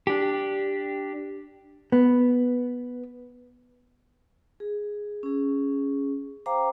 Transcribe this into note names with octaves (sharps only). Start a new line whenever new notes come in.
D4 G4
B3
G#4
C#4 G#4
C5 F5 G5 A#5 D6